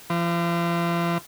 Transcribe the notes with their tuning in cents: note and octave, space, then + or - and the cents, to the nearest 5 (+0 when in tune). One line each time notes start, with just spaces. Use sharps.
F3 -40